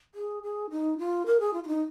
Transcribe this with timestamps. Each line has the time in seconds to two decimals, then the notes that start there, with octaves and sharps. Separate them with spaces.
0.15 G#4
0.43 G#4
0.70 D#4
0.98 F4
1.26 A#4
1.40 G#4
1.53 F4
1.64 F4
1.68 D#4